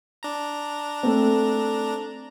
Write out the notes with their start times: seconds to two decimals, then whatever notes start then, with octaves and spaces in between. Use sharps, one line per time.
0.23 D4 A#5
1.03 A3 C4